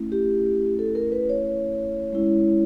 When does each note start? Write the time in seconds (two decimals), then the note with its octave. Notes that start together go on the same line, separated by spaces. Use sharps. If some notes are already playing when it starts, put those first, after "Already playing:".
Already playing: A3 C#4 E4
0.12 G4
0.79 A4
0.95 A#4
1.12 B4
1.29 C#5
2.13 G#3 C#4 E4